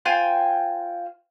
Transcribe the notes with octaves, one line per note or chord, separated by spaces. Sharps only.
F4 C5 G5 G#5